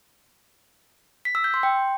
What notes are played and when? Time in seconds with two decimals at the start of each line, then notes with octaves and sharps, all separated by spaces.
1.25 B6
1.35 E6
1.44 G6
1.54 C6
1.63 G5